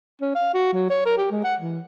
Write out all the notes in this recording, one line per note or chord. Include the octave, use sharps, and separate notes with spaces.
C#4
F5
F#4
F#3
C#5
A#4
G4
G#3
F#5
E3